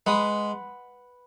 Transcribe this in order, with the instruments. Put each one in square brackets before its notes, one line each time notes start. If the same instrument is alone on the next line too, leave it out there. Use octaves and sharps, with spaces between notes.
[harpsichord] G#3 [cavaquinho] B4 F#5 B5 D#6